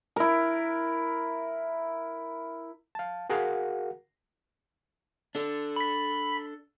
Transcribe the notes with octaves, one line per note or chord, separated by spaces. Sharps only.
E4 A#4
F5 A5
F#4 G#4 A#4 F5 F#5
D4 A4
B5 B6